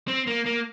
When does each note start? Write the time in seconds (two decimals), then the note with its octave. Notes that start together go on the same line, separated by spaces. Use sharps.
0.08 C4
0.27 A#3
0.46 A#3